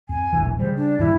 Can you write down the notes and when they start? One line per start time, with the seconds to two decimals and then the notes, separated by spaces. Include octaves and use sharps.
0.09 F2 G#5
0.33 E1 A#1 E3
0.59 C#3 G3 C5
0.76 D4
0.99 G2 E3 G3 E4